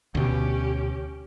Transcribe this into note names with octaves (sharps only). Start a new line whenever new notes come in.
D2 B2 C#4 G4